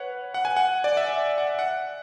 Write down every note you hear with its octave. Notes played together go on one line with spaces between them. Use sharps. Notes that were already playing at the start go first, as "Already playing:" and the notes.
Already playing: B4 C#5 F#5
F#5
G#5
F#5
D5
E5
F#5
F#5